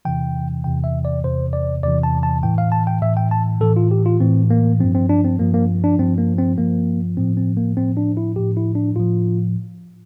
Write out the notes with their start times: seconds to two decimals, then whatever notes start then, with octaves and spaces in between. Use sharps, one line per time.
0.05 E2 C3 E3 G5
0.64 E2 C3 E3 G5
0.84 E5
1.05 D5
1.24 E2 C3 E3 C5
1.53 D5
1.83 E2 C3 E3 D5
2.03 A5
2.23 A5
2.43 A2 E3 G5
2.58 F5
2.72 A5
2.87 G5
3.02 A2 E3 E5
3.17 G5
3.31 A5
3.61 A2 E3 A4
3.76 F4
3.91 G4
4.06 F4
4.20 A2 E3 C4
4.50 A#3
4.80 G2 F3 C4
4.95 C4
5.09 D4
5.25 C4
5.39 G2 F3 A#3
5.54 A#3
5.84 D4
5.99 G2 F3 C4
6.18 A#3
6.38 C4
6.58 G2 F3 A#3
7.17 A2 F3 C4
7.37 C4
7.57 A#3
7.77 A2 F3 C4
7.97 D4
8.17 E4
8.36 A2 F3 G4
8.57 E4
8.75 D4
8.96 A2 F3 F4